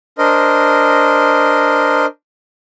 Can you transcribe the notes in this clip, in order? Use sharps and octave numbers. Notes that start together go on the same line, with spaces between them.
D4 A#4 C5 D#5